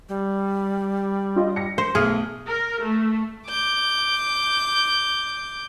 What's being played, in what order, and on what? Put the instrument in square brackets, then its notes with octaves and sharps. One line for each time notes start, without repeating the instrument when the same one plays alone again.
[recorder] G3
[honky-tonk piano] F4 D#5
A#6 C#7
[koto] C5
[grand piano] B1 A3 F6 [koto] G#4
[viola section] A#4
A3
[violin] D6 G6